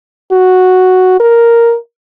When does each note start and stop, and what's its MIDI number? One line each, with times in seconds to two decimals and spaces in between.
0.32 1.17 66
1.20 1.75 70